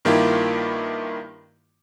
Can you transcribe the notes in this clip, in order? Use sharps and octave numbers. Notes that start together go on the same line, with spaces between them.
G2 D#3 A#3 E4 F4 G4